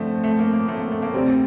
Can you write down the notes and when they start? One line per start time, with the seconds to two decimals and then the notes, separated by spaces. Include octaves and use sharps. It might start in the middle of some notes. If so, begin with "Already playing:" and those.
Already playing: D3 F3 A3 C4
0.24 A3
0.39 A#3
0.53 A#3
0.68 A3
0.80 A#3
0.91 A3
1.02 A#3
1.13 D2 C3 G3 C4